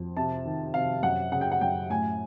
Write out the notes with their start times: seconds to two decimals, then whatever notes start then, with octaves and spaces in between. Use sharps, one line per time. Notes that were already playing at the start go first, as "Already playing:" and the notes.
Already playing: F2
0.17 C3 A5
0.46 D#3
0.74 C3 F5
1.03 F#2 F#5
1.32 C#3 F#5
1.41 G5
1.52 F#5
1.61 F#2 G5
1.90 A2 G#5